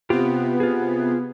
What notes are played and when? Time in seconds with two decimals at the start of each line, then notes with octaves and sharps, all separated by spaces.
0.10 C3 B3 F4 G4
0.60 F4 G#4